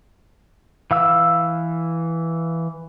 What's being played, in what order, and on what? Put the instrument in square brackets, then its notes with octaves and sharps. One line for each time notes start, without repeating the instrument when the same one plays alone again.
[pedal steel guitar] E3 F5 E6